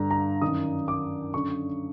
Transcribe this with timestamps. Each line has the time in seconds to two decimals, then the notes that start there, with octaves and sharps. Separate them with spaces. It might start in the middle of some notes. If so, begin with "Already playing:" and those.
Already playing: G2 D3 A#5
0.11 A#5
0.41 F#2 D#3 D#6
0.88 D6
1.34 F#2 D3 C#6